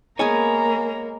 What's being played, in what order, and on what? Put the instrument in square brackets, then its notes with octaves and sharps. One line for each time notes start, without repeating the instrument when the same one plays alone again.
[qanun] G#3 B3 G#4 [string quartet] A#3 [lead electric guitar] C#5 G#5 [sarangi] A#5